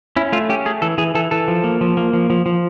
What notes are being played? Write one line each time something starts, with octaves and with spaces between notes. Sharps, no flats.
C#4 E4
A3 F4
C#4 G4
A3 G#4
E3 A4
E3 G#4
E3 A4
E3 A4
F3
A#3
F3
A#3
F3
F3
F3